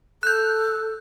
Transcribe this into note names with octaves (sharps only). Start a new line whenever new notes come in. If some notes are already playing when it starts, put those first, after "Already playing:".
A4 F#6 G6